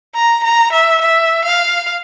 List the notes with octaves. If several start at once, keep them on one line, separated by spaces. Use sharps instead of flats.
A#5
A#5
E5
E5
F5